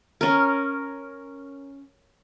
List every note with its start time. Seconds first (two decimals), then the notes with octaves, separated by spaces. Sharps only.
0.21 C#4 A#4